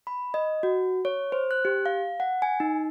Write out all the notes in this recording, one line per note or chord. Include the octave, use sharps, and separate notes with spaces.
B5
D#5
F#4
C#5
C5
F#6
G4
F5
F#5
G#5
D#4